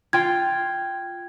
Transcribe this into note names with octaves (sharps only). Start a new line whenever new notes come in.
F4 G5 G#6